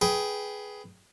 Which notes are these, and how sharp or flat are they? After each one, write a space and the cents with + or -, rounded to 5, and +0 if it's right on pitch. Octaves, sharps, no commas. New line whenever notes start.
G#4 +10 B4 +0 G5 +0